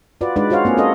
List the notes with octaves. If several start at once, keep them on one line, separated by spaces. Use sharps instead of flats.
F4 F#4 B4 D5
G#3 D4 D#4 B4 D5
F4 F#4 C5 C#5 F5
A#3 C4 G#4
C#4 A4 C#5 D#5